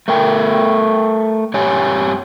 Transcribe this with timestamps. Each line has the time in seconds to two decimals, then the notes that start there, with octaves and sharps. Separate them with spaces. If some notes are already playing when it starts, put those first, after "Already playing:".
0.08 A3 A#4 G5
1.54 G2 G4 C#5 G#5